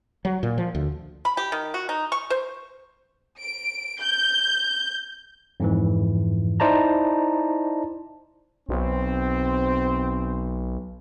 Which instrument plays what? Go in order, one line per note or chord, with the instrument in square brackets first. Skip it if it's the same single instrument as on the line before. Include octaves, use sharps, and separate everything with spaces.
[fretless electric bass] F#3
A#2
F3
D2
[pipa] B5
G4
D#3
F#4
D#4
C#6
C5
[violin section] D7
G6
[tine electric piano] F2 G#2 E3
D#4 E4 C5 D5 A5 A#5
[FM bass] B1 [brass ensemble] C4